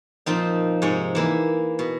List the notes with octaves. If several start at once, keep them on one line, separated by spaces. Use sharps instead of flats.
A#2 F3 C4 D#4
G#2 C3 C#5 G#5
E3 A#3 E4
B2